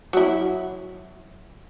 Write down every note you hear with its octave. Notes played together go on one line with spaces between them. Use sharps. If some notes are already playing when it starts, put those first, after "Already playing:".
F#3 E4